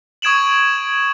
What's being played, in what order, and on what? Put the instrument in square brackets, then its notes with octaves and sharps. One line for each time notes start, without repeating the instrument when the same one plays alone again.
[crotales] C#6 D#6 G#6 D7 E7 F#7